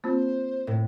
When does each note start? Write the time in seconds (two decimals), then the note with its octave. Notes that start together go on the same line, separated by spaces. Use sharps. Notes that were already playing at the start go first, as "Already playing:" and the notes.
0.04 A#3 C4 F4 C5
0.67 A2